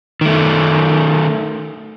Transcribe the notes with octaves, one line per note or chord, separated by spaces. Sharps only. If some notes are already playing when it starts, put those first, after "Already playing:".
D#3 A3